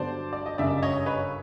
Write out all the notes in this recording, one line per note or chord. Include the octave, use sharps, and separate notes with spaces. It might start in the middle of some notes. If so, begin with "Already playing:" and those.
Already playing: G2 D3 F#3 B3 D4 C5 D5
D5
D#5
G1 F#2 C#3 D5 E5
C#5 D#5
B4 C#5